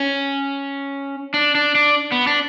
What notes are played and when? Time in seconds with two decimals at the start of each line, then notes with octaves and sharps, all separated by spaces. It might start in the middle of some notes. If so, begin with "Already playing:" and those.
Already playing: C#4
1.34 D4
1.55 D4
1.75 D4
2.12 B3
2.27 D4